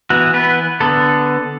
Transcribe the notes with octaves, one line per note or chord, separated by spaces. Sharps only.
E3 B3 F#4
B3 B4
D3 B3 A4